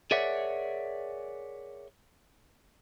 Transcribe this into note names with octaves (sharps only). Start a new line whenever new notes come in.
G#4 A#4 C#5 D5 E5 F#5